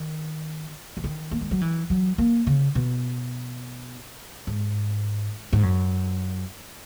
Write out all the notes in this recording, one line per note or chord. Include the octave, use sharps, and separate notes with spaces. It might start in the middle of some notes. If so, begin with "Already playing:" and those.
Already playing: D#3
E3
D#3
A#3
G#3
F#3
E3
F#3
A#3
C#3
B2
G#2
G#2
F#2